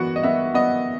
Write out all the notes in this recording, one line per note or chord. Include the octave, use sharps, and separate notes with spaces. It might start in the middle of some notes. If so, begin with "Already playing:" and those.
Already playing: E3 B3 F#4 F#5
D#5
B3 E5
B3 D#5